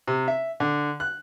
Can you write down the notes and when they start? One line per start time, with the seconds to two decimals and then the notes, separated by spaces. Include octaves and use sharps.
0.07 C3
0.28 E5
0.60 D3
1.00 F#6